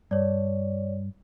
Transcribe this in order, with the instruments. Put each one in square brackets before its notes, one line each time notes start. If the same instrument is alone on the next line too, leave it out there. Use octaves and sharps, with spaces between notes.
[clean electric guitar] G2 [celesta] C#5 D5